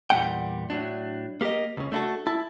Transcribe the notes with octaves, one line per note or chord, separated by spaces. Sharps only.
E2 A#2 G3 A#3 F#5 G5
A2 F#3 D4
A#3 G4 A4 A#4 D#5
C#2 C#3
A3 D4 E4 F#4 A4
E4 A5